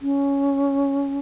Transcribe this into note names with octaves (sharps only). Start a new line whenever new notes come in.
C#4